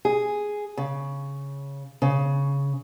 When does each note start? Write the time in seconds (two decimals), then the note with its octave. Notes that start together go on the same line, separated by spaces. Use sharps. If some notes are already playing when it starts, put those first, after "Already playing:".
0.05 G#4
0.77 C#3
2.02 C#3